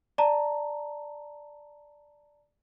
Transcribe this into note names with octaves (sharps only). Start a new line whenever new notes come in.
D5 A5 A#5